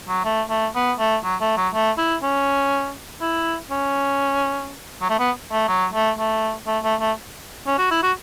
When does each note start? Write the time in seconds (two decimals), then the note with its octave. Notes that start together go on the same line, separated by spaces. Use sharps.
0.08 F#3
0.25 A3
0.50 A3
0.75 B3
0.99 A3
1.24 F#3
1.41 A3
1.57 F#3
1.74 A3
1.98 E4
2.23 C#4
3.21 E4
3.71 C#4
5.02 F#3
5.10 A3
5.19 B3
5.52 A3
5.69 F#3
5.93 A3
6.19 A3
6.67 A3
6.84 A3
7.00 A3
7.67 C#4
7.78 F#4
7.91 E4
8.03 F#4